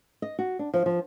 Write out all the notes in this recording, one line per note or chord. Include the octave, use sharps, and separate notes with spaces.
D#5
F#4
D4
F3
F3